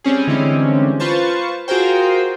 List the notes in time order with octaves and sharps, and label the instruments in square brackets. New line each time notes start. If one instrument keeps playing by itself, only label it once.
[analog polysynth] G3 C4 C#4 G#4
D3 E3 G3 G#3 C4 C#4
F4 B4 C5 A5 C#6
F4 F#4 G#4 A#4 C5 G5